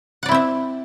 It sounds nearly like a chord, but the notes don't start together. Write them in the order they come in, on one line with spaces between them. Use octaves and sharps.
F#5 D5 E4 C4 E5